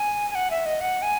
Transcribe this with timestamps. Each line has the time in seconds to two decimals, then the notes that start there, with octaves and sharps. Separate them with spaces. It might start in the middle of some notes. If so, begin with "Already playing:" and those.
Already playing: G#5
0.30 G#5
0.35 F#5
0.51 E5
0.66 D#5
0.81 F#5
1.02 G#5